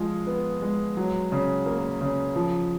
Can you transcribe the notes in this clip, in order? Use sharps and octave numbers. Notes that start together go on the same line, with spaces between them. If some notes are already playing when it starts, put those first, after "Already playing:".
Already playing: F3 G#3 F4 G#4
B3
G#3
F#3
C#3
A#3
C#3
F3